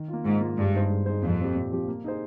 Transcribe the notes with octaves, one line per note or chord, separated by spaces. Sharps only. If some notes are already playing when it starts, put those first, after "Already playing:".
Already playing: D#3
A#3 F4
G#2 D#3
A#3 F4
G2 G#3
D#4 G#4 C5
G#3
D#4 G#4 C5
F2 A#2
F3 C4 G4
A#2
F3 C4 G4
A#3
D#4 G#4 C5